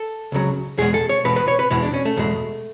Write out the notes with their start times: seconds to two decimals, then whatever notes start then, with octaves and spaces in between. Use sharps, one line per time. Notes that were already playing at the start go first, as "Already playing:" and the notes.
Already playing: A4
0.32 C#2 C#3 F#3
0.78 E2 B2 G#3 G#4
0.94 A4
1.09 C#5
1.24 E2 B2 G#3 B4
1.36 B4
1.48 C#5
1.59 B4
1.71 E2 B2 G#3 E4
1.83 D4
1.94 C#4
2.05 A3
2.17 E2 B2 G#3